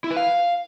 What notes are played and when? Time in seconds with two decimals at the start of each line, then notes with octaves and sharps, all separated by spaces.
0.04 E4
0.10 B4
0.17 F5